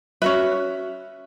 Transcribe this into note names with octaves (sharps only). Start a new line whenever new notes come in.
C#4 F#4 B4 E5